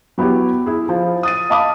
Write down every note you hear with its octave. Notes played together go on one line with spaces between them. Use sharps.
F#3 B3 E4 F#4 G4
E4 G#4
F3
D#6 A6 D#7
D#5 F5 A5 B5 D6 D#6